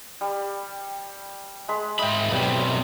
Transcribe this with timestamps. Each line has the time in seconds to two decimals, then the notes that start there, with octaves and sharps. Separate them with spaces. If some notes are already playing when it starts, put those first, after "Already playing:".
0.21 G3
1.69 G#3 B5
1.99 G#2 D#5 E5 G5 B5
2.31 B1 C3 G3 F#4 B4